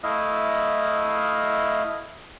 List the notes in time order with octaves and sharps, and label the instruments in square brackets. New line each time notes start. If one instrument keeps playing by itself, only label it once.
[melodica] A3 E4 D#5 F5